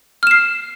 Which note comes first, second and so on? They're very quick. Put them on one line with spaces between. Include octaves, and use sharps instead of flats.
F6 E7 C7